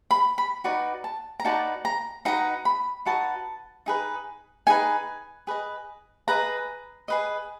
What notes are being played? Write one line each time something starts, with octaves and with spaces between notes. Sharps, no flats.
B5
B5
D#4 F#4 B4 D5
A5
A#5
D#4 F#4 B4 D5 A5
A#5
D#4 F#4 B4 D#5 A#5
B5
D#4 F#4 B4 D#5 A5
D#4 G#4 B4
D#4 G#4 B4 G#5
G#4 B4 D#5
G#4 B4 D#5 A#5
G#4 B4 D#5